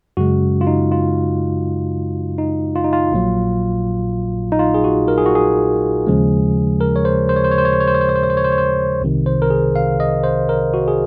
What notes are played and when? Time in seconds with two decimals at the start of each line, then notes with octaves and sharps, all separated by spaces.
0.17 F#2 C#3 G#3 F#4
0.61 F4
0.67 D#4
0.92 F4
2.38 D#4
2.76 F4
2.84 D#4
2.93 F4
3.12 A#1 A#2 F#3
4.52 D#4
4.59 F4
4.74 G#4
4.84 F#4
5.08 A#4
5.18 G#4
5.26 F#4
5.35 G#4
6.07 D#2 C#3 F3 G#3
6.81 A#4
6.96 C#5
7.05 C5
7.29 C5
7.36 C#5
7.44 C5
7.51 C#5
7.58 C5
7.65 C#5
7.73 C5
7.80 C#5
7.87 C5
7.94 C#5
8.01 C5
8.09 C#5
8.16 C5
8.23 C#5
8.30 C5
8.37 C#5
8.44 C5
8.52 C#5
8.58 C5
9.02 C2 C3 D#3
9.26 C5
9.42 A#4
9.50 G#4
9.76 F5
10.00 D#5
10.24 C5
10.49 A#4
10.74 F#4
10.88 G#4